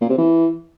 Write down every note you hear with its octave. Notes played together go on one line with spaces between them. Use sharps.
A#2
C3
E3